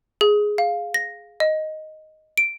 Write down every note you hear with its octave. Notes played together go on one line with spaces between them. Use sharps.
G#4
F5
A#6
D#5
D7